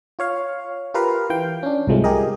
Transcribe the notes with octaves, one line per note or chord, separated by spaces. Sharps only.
F4 C#5 F5
F4 G4 A#4 B4 F5
E3 F5 G5
C#4 D4
C2 G#2 C3 F3 G#3 A3
G4 G#4 A#4 D#5